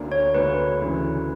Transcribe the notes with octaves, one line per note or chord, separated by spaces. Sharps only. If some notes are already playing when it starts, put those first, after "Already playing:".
Already playing: D2 D3 A#3 D4
C#5
D2 D3 A#3 D4 B4
D2 C#3 E3